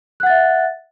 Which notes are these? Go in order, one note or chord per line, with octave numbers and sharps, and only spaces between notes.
E5 F#5 F#6 A6